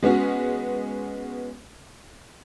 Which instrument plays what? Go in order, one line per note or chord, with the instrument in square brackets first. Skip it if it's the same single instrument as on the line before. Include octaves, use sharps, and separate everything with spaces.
[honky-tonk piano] G#3 B3 C#4 F#4